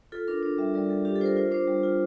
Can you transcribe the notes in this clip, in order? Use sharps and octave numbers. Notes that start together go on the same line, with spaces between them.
F4 A4
D4 A#4
D4
G3 E5
G3 D5
G3 A4
D4 G4
A4
F4 A#4 C5
F4 C5
D4 C5
G3
F4